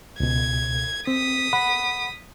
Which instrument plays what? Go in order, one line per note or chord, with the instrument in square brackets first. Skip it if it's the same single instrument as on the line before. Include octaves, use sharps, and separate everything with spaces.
[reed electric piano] C#2 B2 [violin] G#6
[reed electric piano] C4 [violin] D#6 B6
[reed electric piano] F#5 B5